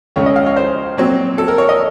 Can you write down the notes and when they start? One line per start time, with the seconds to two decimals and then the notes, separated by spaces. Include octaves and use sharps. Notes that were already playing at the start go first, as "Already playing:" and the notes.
0.16 C#2 C#3 A3 C#4 C#5
0.26 D#5
0.36 F5
0.46 C#5
0.56 C5
0.97 A#2 F#3 C4
1.38 A4
1.48 A#4
1.58 C#5
1.69 D#5